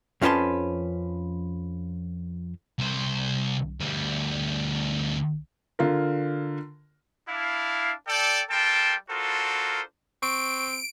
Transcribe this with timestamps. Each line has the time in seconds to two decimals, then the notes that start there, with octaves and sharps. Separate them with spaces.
0.22 F2 F3 C#4 B4 A5 C6
2.79 C2 C5
3.80 D2 G3
5.79 D3 F4 A#4
7.29 D4 E4 F5
8.08 A4 D5 G5
8.50 G3 A4 A#4 G5 A5 C6
9.10 D4 F4 F#4 A4 A#4 C5
10.23 C4 C#6 D7